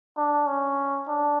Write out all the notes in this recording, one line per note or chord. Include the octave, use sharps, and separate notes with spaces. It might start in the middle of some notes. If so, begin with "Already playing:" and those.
D4
C#4
D4